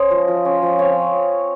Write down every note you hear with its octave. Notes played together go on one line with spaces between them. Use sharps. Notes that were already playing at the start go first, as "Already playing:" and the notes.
Already playing: C#4 C5 D#5
F3
F3
C#4
F3
C4 C#5 F5